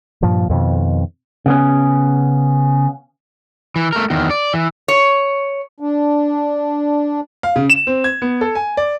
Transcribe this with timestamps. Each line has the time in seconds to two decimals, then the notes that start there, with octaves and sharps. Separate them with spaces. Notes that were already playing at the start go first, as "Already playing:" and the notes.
0.23 G2 A#2 F3
0.50 F2 B2 D#3
1.46 C#3 B3 C#4
3.76 E3
3.93 A3 A#4
4.10 E2 D#3
4.30 D5
4.53 E3
4.88 C#5
5.80 D4
7.43 F5
7.56 C#3
7.70 E7
7.87 C4
8.04 G#6
8.22 B3
8.41 A4
8.55 G#5
8.77 D5